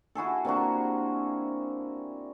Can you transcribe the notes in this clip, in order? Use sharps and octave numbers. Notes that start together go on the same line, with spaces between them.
E4 F#4 G#4 A4
C3 A#3 D4 F#4